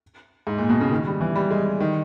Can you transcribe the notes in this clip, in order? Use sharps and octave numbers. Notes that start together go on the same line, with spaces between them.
G#2
A#2
B2
C#3
D#3
G3
E3
G3
G#3
D#3